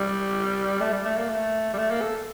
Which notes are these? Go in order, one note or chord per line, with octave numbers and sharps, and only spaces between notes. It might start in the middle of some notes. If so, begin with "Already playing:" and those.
Already playing: G3
A3
G3
A3
A#3
A3
G3
A3
A#3
A4